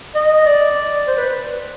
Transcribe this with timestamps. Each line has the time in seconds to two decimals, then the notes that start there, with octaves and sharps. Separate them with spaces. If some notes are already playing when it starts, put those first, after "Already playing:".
0.15 D#5
0.46 D5
1.07 C5
1.17 B4